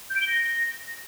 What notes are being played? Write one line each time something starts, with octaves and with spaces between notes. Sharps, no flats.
G6
D7
G7
A#6